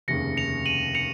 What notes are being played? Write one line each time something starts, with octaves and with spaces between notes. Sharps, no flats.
F1 D#2 C#3 A#6 C#7
C#7 F7
D#7 F#7
C#7 F7